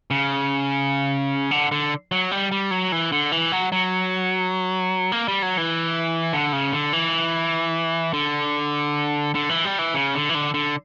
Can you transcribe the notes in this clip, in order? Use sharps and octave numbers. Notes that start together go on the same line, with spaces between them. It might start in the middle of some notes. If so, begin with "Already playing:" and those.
C#3
D3
D3
F#3
G3
G3
F#3
E3
D3
E3
F#3
F#3
A#3
G3
F#3
E3
D3
C#3
D3
E3
D3
D3
E3
G3
E3
C#3
D3
E3
D3
D3